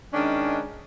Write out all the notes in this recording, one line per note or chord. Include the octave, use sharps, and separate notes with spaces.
D#3 G#3 C#4 D4